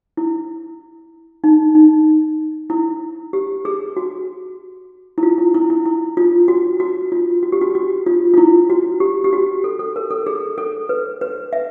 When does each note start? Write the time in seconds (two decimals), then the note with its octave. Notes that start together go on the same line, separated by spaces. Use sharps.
0.17 E4
1.44 D#4
1.75 D#4
2.70 E4
3.33 G4
3.65 G#4
3.97 F#4
5.18 E4
5.23 F4
5.38 E4
5.54 E4
5.70 E4
5.86 E4
6.17 F4
6.48 F#4
6.80 F#4
7.12 F4
7.43 F#4
7.52 G4
7.61 F#4
7.75 F#4
8.06 F4
8.34 F4
8.38 E4
8.70 F#4
9.00 G4
9.24 G4
9.33 F#4
9.64 A4
9.79 A4
9.96 A#4
10.10 A4
10.27 G#4
10.58 A4
10.89 B4
11.21 B4
11.53 E5